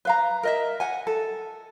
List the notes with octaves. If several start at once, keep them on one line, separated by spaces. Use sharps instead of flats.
B4 F5 A#5
A#4 D#5 E5
F#5 G#5
A4